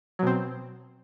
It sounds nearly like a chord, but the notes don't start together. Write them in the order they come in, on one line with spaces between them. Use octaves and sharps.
F#3 B2 C4